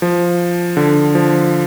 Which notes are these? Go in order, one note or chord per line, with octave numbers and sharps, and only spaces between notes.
F3
D3
F3